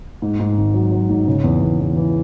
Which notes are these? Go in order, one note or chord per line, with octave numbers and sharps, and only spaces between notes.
G#2
G#2
G#1
F#3
F#3
G#2
C#3
E2
E2
E2
E3